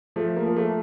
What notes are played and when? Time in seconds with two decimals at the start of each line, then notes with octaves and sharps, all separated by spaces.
0.16 F3 A3
0.36 A#3
0.46 F3
0.56 A3